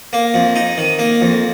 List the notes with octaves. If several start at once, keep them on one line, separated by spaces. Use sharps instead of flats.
A#3
F2
D#4
D#3
A#3
F2